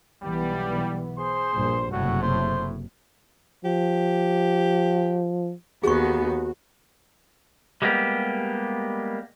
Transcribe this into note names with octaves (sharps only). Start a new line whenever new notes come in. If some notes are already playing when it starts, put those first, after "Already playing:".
B1 E3 G3 B3
G#4 C5 C6
A#1 G2 A#2
F#1 A2 C3 A3 F#4
C5
F3 G4
D#2 B3 F#4 G#4 C#6
G3 G#3 A#3 B3 G4